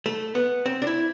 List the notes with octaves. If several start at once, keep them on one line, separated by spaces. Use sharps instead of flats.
A3
B3
C4
D4
E4